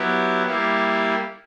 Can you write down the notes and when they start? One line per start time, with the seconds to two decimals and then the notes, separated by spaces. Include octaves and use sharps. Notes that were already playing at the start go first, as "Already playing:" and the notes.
Already playing: F#3 B3 E4 G4
0.46 G3 A#3 E4 G4